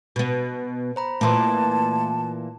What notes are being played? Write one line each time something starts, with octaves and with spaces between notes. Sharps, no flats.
B2 B3
C5 A#5 B5
A#2 E3 A3 A5 C6